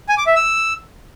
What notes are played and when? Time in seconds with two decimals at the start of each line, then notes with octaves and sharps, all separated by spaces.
0.09 G#5
0.18 D6
0.27 E5
0.36 E6